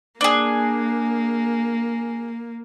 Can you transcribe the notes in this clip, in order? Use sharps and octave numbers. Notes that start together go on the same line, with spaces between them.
A#3 D4 G#4